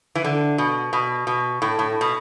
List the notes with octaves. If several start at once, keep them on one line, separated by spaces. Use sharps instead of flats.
E3
D3
B2
B2
B2
A2
A2
B2